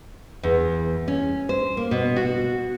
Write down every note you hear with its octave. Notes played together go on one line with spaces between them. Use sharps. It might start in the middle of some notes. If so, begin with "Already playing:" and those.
E2
C#4
C5
A#3
B2
F#4